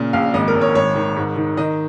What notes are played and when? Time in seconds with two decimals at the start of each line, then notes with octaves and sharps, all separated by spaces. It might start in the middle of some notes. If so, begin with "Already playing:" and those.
Already playing: A#2 C#3
0.13 A#1 F5
0.34 G#1 D#5
0.48 A#4
0.55 G#1
0.61 C#5
0.75 G#1 C#5
0.95 D#3
1.16 G#2
1.37 D#3
1.57 D#3 D#5